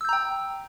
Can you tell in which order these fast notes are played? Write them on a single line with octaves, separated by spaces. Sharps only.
E6 G6 A#5 G5